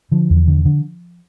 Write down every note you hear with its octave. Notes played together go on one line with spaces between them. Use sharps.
D3 F3
E2
D3
D3